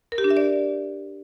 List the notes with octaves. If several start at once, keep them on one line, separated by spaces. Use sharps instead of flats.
A#4
G4
D4
E5
D5